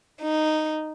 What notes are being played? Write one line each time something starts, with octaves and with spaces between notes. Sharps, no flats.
D#4